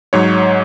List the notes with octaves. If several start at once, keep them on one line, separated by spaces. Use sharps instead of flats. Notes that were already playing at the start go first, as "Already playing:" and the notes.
G#2 F#3 C#5